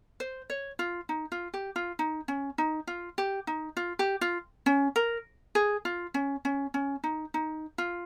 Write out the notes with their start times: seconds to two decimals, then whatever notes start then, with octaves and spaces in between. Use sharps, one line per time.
0.20 C5
0.50 C#5
0.79 F4
1.09 D#4
1.32 F4
1.54 G4
1.76 F4
1.99 D#4
2.28 C#4
2.58 D#4
2.87 F4
3.18 G4
3.47 D#4
3.77 F4
3.99 G4
4.21 F4
4.66 C#4
4.96 A#4
5.55 G#4
5.85 F4
6.14 C#4
6.45 C#4
6.74 C#4
7.04 D#4
7.34 D#4
7.78 F4